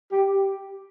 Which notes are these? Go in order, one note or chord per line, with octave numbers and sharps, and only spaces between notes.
G4